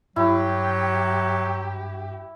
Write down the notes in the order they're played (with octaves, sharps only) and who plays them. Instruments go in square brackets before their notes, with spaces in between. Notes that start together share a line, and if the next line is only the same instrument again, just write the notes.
[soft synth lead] G2 [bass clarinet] F#3 [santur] E4 [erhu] G4